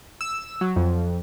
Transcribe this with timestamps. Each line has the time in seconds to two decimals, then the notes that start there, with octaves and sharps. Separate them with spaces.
0.21 E6
0.61 F#3
0.76 F2